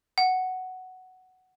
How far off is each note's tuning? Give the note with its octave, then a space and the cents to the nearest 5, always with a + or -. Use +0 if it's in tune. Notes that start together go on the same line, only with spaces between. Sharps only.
F#5 +5